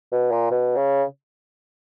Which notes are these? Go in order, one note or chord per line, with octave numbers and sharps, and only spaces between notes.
B2
A#2
B2
C#3